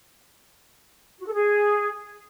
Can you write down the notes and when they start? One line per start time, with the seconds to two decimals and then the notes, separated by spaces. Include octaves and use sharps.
1.20 F#4
1.27 A4
1.34 G#4